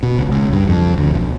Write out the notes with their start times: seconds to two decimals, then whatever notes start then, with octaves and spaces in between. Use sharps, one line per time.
0.03 B2
0.18 C#2
0.31 C#2
0.52 G2
0.68 F2
0.97 D2
1.11 B1